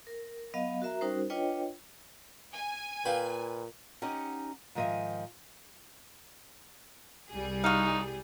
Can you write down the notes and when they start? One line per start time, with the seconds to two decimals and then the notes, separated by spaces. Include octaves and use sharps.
0.07 A#4
0.54 F#3 B3 D#5 F5
0.82 F#4 A#4 E5 A#5
1.01 G3 C#4 D#4 F#4 A#4 C5
1.30 D4 F4 B4 C#5 D#5 G5
2.52 G#5
3.05 A#2 G#4 B4 F5 G5
4.02 C#4 D#4 G4 D#5 F#5
4.75 G#2 D#3 F3 D#5 E5 G#5
7.30 C2 G3 G#4
7.64 D#4 F#4 F5